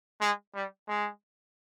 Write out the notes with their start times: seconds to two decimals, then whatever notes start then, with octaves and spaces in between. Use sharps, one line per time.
0.21 G#3
0.55 G3
0.88 G#3